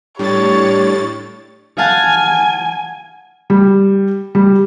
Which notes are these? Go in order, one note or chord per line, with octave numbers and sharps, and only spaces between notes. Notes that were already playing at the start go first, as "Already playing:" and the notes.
A2 G3 D4 G4 C#5 A6
F5 F#5 G#5 A5
G3
G3